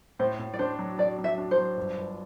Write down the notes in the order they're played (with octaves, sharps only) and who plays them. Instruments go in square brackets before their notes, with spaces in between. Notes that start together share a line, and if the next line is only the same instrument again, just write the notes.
[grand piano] A2 [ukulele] C5
[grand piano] A2
[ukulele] D5
[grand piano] D4 [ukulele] C5
[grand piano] F#3
[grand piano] F#3 [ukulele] D5
[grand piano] F#3
[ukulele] E5
[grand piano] D4
[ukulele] C5
[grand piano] F#3
G1
G1